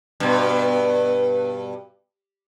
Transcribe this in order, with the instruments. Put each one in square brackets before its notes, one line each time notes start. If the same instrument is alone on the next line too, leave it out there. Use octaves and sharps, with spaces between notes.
[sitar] G2 B2